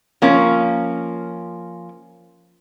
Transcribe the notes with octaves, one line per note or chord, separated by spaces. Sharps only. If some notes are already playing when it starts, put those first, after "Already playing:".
F3 A#3 C#4